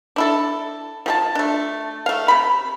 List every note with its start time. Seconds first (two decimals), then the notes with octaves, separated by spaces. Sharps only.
0.16 D4 E4 A4
1.06 F3 G#4 A5
1.35 A3 D4
2.06 A3 F5
2.28 C3 B5